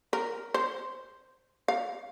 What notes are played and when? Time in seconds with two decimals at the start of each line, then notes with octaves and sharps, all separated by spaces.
0.13 A#4
0.54 C5
1.68 F5